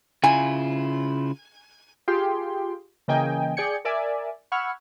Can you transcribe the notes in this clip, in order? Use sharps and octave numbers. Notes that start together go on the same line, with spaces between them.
C#3 E4 F4 G#5
F4 G4 G#4 G5 C6
C#3 E3 A#3 D#5 G5 G#5
G#4 D5 G5 G#6 C#7
A#4 D5 E5 G#5
F#5 B5 C#6 E6 F6 G#6